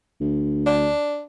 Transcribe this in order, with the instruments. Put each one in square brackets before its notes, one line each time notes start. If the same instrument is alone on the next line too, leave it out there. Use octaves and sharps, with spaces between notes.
[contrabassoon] D2
[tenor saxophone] D4